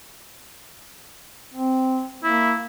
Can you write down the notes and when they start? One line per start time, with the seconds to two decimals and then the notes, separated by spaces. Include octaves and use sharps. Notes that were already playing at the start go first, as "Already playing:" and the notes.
1.54 C4
2.23 A#3 E4